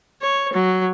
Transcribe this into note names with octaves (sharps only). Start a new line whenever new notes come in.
C#5
F#3